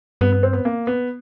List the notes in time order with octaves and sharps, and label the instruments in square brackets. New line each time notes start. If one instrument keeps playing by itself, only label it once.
[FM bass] G2 [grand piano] B3
[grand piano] B3
C4
B3
A#3
B3